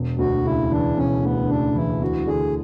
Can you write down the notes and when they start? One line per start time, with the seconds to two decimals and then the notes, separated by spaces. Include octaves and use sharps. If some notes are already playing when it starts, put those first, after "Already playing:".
Already playing: E1
0.19 D2 F#4
0.45 C#3 E4
0.71 E3 D4
0.97 E1 C#4
1.23 D2 B3
1.49 C#3 D4
1.75 E3 E4
2.01 D2 F#4
2.27 D3 G#4